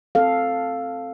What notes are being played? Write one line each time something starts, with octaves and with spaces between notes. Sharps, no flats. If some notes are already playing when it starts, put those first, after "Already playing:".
C4 A4 F5